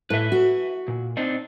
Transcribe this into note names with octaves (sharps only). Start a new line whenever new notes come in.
A2 B4 E5
F#4
A#2
C4 D4 D#4